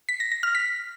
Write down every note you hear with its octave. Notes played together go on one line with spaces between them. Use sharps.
B6
A#6
A#6
F6
B6